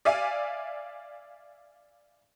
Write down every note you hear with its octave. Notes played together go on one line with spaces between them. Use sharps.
D5 E5 F5 G#5